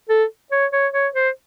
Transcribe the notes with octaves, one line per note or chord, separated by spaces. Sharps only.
A4
C#5
C#5
C#5
C5